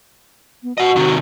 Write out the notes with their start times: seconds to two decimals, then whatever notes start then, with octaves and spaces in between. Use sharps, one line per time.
0.63 B3
0.78 F#4 D#5 F#5
0.96 C3 D#3